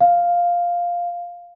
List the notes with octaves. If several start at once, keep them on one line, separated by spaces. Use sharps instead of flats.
F5